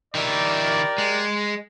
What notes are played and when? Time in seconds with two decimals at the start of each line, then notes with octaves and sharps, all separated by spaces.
0.15 D#3 E4 G4 A#4 D5
0.98 G#3